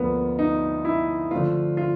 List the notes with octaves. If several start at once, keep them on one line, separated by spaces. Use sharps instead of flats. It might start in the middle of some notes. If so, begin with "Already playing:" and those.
Already playing: D2 D3 F3 A#3 B3
D#4
E4
D3 F3 A3 F4
F4